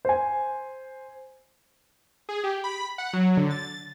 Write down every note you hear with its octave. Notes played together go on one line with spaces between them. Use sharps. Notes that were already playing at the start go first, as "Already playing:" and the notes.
C5 G#5
G#4
G4
B5
F#5
F#3
D3
A6